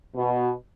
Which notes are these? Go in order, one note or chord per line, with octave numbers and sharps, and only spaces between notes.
B2